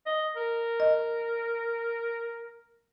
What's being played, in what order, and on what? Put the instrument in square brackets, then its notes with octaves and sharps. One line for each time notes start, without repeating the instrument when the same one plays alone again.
[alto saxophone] D#5
A#4
[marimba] D#5